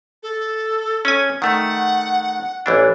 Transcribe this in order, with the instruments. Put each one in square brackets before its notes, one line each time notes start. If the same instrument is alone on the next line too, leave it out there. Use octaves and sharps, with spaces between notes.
[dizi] A4
[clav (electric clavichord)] C#4 G#5
[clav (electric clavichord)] D#3 A3 [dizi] F#5
[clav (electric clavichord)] A1 E3 D4